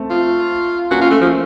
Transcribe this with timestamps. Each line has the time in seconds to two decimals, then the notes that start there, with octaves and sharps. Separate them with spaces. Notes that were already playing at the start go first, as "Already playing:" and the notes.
Already playing: A3 C4
0.10 F4
0.91 A#3 C#4 F#4
1.01 F4
1.11 A3
1.21 F3